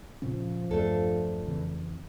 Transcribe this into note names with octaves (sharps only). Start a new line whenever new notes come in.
A#2 C#3 F3 C#4
E2 G2 A3 D4 A4
F2 C#3 E3